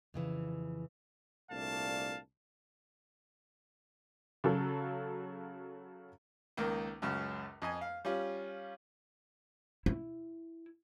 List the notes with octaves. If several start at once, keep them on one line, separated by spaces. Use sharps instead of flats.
F2 C#3 E3
C2 A#2 A3 D4 F5 A5
C#3 F#3 A4
C#2 D#3 A#3
C#2 F#2 C#3
F2 D#5 G#5
F5
G3 C#4 F4
E4